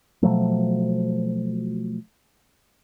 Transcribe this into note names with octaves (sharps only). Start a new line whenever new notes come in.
B2 F3 F#3 A3